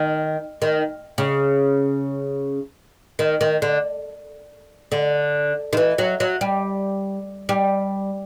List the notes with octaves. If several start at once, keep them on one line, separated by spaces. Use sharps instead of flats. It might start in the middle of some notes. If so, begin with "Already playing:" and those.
Already playing: D#3
D#3
C#3
D#3
D#3
D3
D3
D#3
E3
F#3
F#3
G3
G3